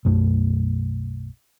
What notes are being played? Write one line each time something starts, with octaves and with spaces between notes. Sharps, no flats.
B1 F#2 A3